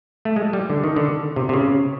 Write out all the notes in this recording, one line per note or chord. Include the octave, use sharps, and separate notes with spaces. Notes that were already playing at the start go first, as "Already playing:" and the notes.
A3
G#3
G3
D3
D#3
D3
C3
C3
C#3